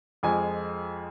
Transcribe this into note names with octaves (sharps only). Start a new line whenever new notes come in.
F2 F3 G#3 G#5